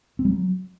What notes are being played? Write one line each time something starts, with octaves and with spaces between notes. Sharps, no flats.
C4
G3
F#3